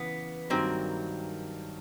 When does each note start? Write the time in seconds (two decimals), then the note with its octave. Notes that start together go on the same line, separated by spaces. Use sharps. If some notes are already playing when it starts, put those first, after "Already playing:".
Already playing: C#3 E3 B3
0.50 G2 D#3 F#3 A#3 C4